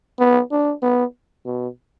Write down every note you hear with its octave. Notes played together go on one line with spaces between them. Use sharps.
B3
D4
B3
B2